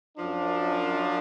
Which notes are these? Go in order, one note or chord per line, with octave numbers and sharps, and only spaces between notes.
F#2 F3 D4